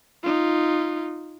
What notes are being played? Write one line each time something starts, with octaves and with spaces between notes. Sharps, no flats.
D#4 F4